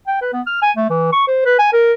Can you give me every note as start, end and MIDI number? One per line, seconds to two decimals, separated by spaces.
0.07 0.18 79
0.21 0.28 71
0.33 0.41 59
0.47 0.59 89
0.62 0.71 80
0.76 0.86 57
0.90 1.11 52
1.13 1.23 85
1.28 1.44 72
1.45 1.57 71
1.59 1.72 80
1.73 1.93 70